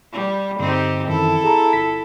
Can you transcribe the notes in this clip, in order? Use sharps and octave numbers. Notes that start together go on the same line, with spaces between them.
G3
G2 D3 C4 D#4 G4
F#2 D#3 E3 E4 A4
G#4 A5 A#5
G1 B6